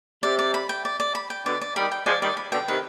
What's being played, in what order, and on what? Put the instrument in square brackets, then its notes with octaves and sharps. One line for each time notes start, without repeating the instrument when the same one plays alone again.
[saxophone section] C3 [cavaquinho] D5
[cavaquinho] D5
B5
G5
D5
D5
B5
G5
[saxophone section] B2 D3 [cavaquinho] D5
[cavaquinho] D5
[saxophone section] D#3 G3 [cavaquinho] B5
[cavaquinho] G5
[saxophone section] F3 G#3 [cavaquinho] D5
[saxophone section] D#3 G3 [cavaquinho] D5
[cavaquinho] B5
[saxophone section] B2 D3 [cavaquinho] G5
[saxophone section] C3 D#3 [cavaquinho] B4